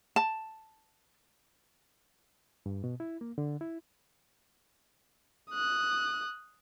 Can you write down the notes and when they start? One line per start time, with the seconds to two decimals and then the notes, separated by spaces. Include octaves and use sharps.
0.16 A5
2.66 G2
2.84 B2
3.00 E4
3.21 A#3
3.38 D3
3.61 E4
5.51 D#6 F#6